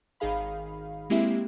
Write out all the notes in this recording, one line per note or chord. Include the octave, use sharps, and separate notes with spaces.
G#1 D#3 D#4 G#4 F5 B5
G#3 A#3 C4 E4 G4 E5